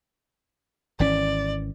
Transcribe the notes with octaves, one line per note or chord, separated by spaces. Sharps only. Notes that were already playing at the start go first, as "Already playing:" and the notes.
G#1 E3 C#4 D5